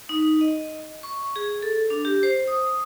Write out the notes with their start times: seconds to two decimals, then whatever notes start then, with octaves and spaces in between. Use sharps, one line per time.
0.09 D#4
0.41 D#5
1.03 C#6
1.36 G#4
1.63 A4
1.90 D4
2.05 G4
2.23 C5
2.48 D#6